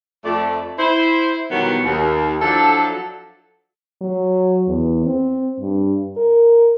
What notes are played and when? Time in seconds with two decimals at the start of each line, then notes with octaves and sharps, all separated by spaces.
0.24 F2 A3 D5
0.78 E4 C5
1.51 B2 D#3 E3 F#3 G3 B3
1.84 D#2
2.41 F3 F#3 D4 E4 A4
4.01 F#3
4.67 E2
5.06 C4
5.60 G2
6.17 A#4